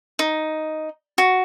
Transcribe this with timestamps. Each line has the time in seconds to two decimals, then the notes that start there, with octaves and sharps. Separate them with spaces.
0.19 D#4
1.18 F#4